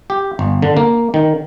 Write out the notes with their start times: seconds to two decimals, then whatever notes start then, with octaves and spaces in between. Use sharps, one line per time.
0.10 G4
0.39 G1
0.62 D3
0.77 A#3
1.14 D#3